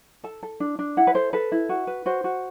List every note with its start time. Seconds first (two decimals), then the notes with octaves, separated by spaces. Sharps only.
0.24 A4 A5
0.43 A4
0.60 D4
0.79 D4
0.97 E4 F#5
1.07 B4
1.15 A4 C5
1.33 A4 B4
1.52 E4
1.69 F#4
1.87 B4
2.06 F#4 C5
2.24 F#4